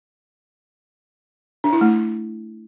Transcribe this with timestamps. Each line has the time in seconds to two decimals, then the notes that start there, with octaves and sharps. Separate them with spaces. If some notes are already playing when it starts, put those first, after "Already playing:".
1.64 D4
1.73 E4
1.81 A3